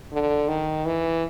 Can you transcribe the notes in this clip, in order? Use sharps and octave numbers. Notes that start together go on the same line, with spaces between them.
D3
D#3
E3